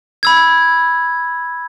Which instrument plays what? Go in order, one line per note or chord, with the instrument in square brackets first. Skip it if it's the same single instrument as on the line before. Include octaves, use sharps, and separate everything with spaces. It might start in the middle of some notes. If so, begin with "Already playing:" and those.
[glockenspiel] B5 E6 G#6